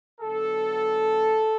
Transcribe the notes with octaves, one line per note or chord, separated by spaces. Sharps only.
D3 F#3 B3 A4